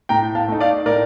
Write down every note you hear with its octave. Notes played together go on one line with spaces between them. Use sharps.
A2 G5 A#5
F5 A5
A3 D#4
D5 F5
A2 A#4 D5